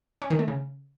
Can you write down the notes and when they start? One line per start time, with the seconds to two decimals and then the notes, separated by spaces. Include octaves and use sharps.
0.22 C#4
0.30 D#3
0.39 A3
0.48 C#3